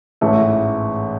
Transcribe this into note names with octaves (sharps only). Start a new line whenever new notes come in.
A1 G#2 E3 A3